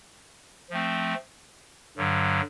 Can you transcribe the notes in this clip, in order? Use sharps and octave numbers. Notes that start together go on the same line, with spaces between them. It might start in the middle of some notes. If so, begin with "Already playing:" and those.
F3 A3 C4
G2 D3 F#3